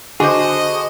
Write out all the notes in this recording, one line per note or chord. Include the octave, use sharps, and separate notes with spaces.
D3 F#4 G#4 C5 D#5